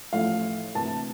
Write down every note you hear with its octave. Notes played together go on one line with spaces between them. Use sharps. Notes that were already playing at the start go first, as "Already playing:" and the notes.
A1 A2 F3 A3 F5
D2 C3 E3 A#3 A5